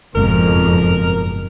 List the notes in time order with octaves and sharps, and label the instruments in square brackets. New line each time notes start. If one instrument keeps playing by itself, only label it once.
[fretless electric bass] F#1 G#2 B2 [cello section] F2 [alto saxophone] A#4